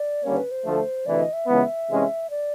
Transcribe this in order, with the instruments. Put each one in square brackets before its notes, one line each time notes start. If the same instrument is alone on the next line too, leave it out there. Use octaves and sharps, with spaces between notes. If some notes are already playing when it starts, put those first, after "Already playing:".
Already playing: [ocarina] D5
[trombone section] D#2 D3 G3 A#3 C#4 [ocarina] C#5
[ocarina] B4
C5
[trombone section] D2 D3 F3 A3
[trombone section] D2 C3 E3 [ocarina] D5
[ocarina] D#5
E5
[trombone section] C#2 C#3 E3 G#3 B3
C3 E3 G#3 C#4
[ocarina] D5